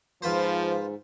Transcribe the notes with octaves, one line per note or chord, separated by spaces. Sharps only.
G#2 F3 F4 B4 C5